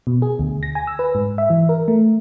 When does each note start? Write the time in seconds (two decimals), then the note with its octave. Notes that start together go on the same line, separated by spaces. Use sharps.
0.07 B2
0.22 G#4
0.39 D2
0.63 A#6
0.75 G#5
0.87 E6
0.99 B4
1.15 G#2
1.38 E5
1.50 E3
1.69 A#4
1.88 A3